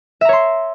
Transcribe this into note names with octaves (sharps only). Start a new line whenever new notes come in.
C#5 E5 A#5 C6